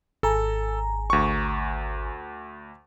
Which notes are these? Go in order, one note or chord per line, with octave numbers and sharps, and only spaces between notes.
G#1 A4 G#5 A#5
D2 C#6